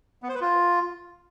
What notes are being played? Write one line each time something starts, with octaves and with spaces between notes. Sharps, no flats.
B3
C5
B4
F4